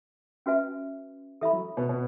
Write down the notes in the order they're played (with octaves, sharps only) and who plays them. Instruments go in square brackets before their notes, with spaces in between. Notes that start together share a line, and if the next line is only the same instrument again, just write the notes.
[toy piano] C#4 F#4 B4 E5 G#5
[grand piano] E3 [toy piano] A4 E5 B5
[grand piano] F#3
B2 B3
B2 B3